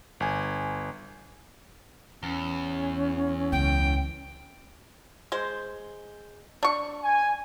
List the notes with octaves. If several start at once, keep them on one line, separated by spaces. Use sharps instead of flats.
G1 G#5
E2 C#4
C#2 G5
G#3 C5
D4 C#6
G#5